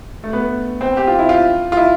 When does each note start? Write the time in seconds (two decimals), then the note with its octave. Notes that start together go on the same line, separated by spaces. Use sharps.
0.24 A3
0.33 B3
0.81 C4
0.97 G4
1.07 F4
1.19 E4
1.29 F4
1.72 F4
1.77 E4